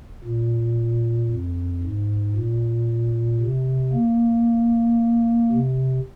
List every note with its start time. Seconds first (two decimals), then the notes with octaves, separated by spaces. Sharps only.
0.24 A#2
1.30 F2
1.83 G#2
2.36 A#2
3.40 C3
3.93 A#3
5.51 C3